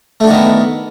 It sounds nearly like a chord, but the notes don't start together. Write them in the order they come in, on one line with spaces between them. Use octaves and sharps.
A3 D4 F#4 D#3 B3